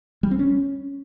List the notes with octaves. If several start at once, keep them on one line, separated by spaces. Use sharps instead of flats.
G3
C4
C#4